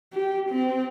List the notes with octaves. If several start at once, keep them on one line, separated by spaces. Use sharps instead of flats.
G4
C4